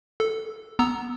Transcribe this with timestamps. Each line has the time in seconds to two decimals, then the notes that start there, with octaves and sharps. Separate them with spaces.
0.20 A4
0.79 B3 A#5 E6